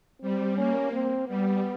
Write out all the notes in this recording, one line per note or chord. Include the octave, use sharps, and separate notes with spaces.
G3 C4
A#3 C#4
C4
G3 B3